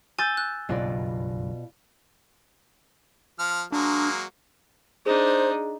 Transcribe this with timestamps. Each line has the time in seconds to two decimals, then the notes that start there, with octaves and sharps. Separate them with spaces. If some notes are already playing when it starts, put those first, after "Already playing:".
0.19 G#5 E6 G6 A6
0.37 F#6
0.69 F#1 B1 G2 B2 F4 D5
3.39 F3 F6
3.72 F#3 G#3 A#3 D4
5.06 D4 D#4 G#4 C5